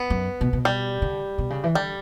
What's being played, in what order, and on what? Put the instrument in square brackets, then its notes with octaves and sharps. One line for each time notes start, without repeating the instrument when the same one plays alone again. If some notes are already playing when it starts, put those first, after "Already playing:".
Already playing: [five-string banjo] B3
[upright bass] F#2
B2
B2
[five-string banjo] G3
[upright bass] D3
B2
C#3
E3
[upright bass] D3 [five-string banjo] G3